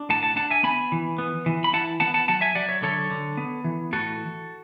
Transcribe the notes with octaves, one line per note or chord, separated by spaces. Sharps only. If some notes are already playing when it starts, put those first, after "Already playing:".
Already playing: D4
A2 F#5 A5
F#5 A5
D4 F#5 A5
E5 G#5
B3 G#5 B5
E3
B3
E3
B5
E4 F#5 A5
B3 F#5 A5
F#5 A5
F#3 F#5 A5
E5 G#5
F#3 D5 F#5
C#5 E5
D3 A4 C#5
D3
B3
E3
A2 F#4 A4